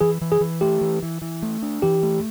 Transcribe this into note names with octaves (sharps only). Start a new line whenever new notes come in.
E3 G#4
E3
G#4
E3
A3 G4
E3
E3
E3
A3
D4
E3 G4
A3